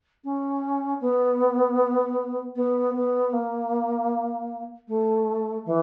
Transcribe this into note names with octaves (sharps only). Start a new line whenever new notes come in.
C#4
B3
B3
B3
A#3
A3
E3